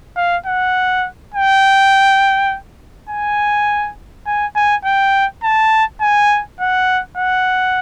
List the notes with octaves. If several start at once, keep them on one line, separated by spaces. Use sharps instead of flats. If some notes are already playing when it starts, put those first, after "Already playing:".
F5
F#5
G5
G#5
G#5
G#5
G5
A5
G#5
F#5
F#5